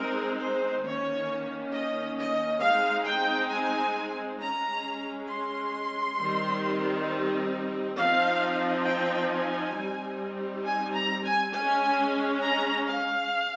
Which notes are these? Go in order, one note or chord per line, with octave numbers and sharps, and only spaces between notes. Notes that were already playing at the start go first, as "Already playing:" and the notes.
Already playing: G#3 C4 D#4 A#4
C5
D#3 A#3 C#4 C#5
D#5
D#5
G#3 C4 D#4 F5
G5
G#5
G#3 C#4 A#5
C6
D#3 G3 C4 D#4
F3 C4 D#4 F5
G5
G#5
G3 C4 D#4
G#5
A#5
G#5
G#3 C#4 G#5
A#5
F5